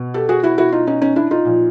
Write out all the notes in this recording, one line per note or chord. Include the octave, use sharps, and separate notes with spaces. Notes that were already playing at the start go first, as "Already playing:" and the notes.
Already playing: B2
G4 A4
F#4 G#4
E4 F#4
E4 F#4
D#4 F4
C#4 D#4
C#4 D#4
D4 E4
D#4 F4
A#2 F3